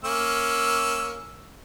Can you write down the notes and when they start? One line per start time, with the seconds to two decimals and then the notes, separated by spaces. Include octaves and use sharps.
0.04 A#3 C#4 E6